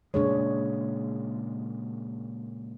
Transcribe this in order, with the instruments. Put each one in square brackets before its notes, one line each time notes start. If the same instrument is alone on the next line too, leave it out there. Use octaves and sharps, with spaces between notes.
[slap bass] A#2 C#3 G#3 [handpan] D4 G#4 C#5